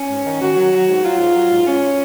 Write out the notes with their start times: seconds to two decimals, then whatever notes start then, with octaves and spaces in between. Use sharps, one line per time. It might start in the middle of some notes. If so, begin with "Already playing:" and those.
Already playing: C#4
0.09 G#2
0.26 D#3
0.41 D#3 F#4
0.57 F#3
0.73 F#3
0.88 G#2
1.04 F#3 F4
1.20 G#2
1.35 F#3
1.51 G#2
1.67 G#2 C#4